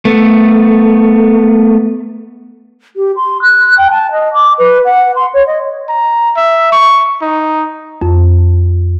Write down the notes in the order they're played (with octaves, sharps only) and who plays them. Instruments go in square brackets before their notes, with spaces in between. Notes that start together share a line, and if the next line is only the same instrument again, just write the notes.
[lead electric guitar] A3 B3
[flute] G4
C6
F#6
G5
A5
D#5
D6
B4
F#5
C6
C#5
D#5
[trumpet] A#5
E5
C#6
D#4
[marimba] F2